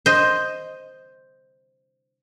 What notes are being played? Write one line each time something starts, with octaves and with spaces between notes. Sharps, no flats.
C5 D#5